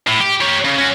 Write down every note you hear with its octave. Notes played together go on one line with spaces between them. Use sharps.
A2
G4
G4 C#5
C#3
C#4 F#4